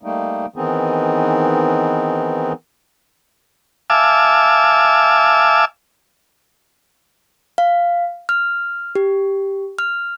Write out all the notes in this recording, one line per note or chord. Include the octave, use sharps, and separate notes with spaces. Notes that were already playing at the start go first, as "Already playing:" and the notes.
G3 A3 A#3 D#4
D#3 E3 B3 C4 D#4 G#4
E5 F5 G#5 A5 D6 E6
F5
F6
G4
F6